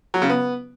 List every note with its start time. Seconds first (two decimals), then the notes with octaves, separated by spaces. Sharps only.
0.14 F#3
0.22 C#3
0.30 B3